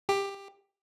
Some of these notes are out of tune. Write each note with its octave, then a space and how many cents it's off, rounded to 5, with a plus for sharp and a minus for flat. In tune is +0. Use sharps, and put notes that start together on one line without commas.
G4 +15